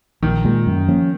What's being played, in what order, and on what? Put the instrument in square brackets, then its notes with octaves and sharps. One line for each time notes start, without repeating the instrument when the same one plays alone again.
[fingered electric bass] A#1 [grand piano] D#3
[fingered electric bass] A#2 G#3
F#2
F3 A#3 C#4